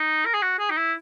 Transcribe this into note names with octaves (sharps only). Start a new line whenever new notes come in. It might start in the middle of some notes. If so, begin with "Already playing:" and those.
Already playing: D#4
A#4
G#4
F#4
G#4
D#4
E4